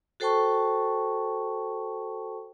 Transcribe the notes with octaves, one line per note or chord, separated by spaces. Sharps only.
F#4 A4 C5 G5 A5 C#6